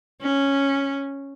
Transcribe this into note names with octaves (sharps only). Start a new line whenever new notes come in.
C#4